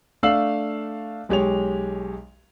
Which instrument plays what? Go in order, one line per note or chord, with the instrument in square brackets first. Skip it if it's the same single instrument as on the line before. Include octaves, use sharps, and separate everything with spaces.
[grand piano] A3 D4 F5 E6 C7 F#7
B1 G#3 G4 C#5 F7